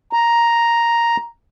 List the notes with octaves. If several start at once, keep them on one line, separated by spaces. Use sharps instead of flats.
A#5